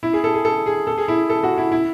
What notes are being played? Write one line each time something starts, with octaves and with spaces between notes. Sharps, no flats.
E4
G#4
A4
G#4
A4
G#4
A4
G#4
E4
A4
F#4
E4
E4